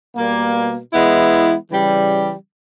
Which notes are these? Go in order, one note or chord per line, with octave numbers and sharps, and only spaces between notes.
B2 G3 A#3
E3 G#3 B3 E4
C#3 E3 G3